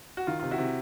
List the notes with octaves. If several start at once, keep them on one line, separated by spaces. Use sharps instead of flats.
F#4
D#3 F4
C3 F4
E4 F#4
C3